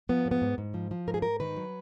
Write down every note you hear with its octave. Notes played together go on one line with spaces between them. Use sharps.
F3 B3
G#2
B3
G#2
G#2
F3
F3
G#2 A#4
G#4
G#2 A#4
D#3 B4
F#3